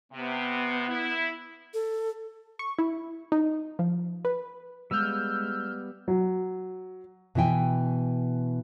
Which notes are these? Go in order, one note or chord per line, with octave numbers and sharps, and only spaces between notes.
C3 B3
E4
A4
C#6
E4
D#4
F3
B4
G3 G#3 B3 F5 E6 F6 G6
F#3
B2 E3 E4 G5 G#5